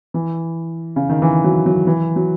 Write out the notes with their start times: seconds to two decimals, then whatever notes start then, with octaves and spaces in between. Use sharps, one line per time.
0.14 E3
0.96 C#3
1.09 D#3
1.22 E3
1.44 F#3
1.66 F#3
1.87 E3
2.16 F#3